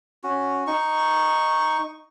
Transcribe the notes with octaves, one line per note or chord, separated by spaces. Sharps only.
C#4 F#4
D#4 C#6